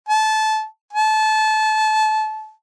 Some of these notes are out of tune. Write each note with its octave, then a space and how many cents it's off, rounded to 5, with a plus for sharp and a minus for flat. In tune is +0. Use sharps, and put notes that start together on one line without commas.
A5 -20
A5 -25